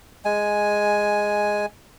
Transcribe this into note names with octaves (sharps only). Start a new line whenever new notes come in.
G#3 G#5